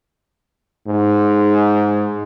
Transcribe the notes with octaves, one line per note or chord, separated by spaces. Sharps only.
G#2